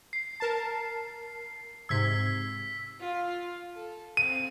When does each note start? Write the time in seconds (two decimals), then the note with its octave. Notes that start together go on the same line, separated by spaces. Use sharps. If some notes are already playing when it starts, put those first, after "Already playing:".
0.13 C7
0.40 A#4 A5
1.89 G#2 C3 E6 G#6 B6
3.00 F4
3.74 A4
4.17 C4 F5 D#7